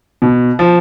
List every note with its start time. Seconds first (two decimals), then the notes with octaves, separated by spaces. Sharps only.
0.22 B2
0.59 F3